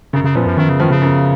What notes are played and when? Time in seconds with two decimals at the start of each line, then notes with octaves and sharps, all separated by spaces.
0.13 F#2 C#3
0.24 C#3
0.35 A#2 F3 B3
0.46 F#2
0.58 F#2 D#3
0.69 C#3
0.80 D#3 F3 B3
0.91 C#3
1.02 F#2